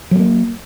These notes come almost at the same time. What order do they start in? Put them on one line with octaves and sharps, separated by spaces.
F#3 A3 A#3